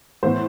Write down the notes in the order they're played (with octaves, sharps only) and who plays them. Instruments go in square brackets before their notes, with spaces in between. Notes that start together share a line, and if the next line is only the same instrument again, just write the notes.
[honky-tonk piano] A2 E3 B3 C5